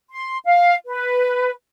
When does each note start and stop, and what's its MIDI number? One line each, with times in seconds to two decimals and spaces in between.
0.11 0.38 84
0.44 0.75 77
0.86 1.51 71